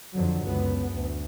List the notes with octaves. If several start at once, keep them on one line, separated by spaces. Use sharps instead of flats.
F2 D3 F#3
C#2 F#2 B3
D2